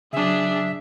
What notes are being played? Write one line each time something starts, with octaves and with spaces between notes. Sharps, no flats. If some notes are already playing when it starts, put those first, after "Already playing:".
C#3 F#3 D4 G#4 E5